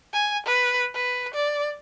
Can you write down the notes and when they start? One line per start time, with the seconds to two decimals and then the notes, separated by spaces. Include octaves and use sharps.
0.14 G#5
0.46 B4
0.94 B4
1.34 D5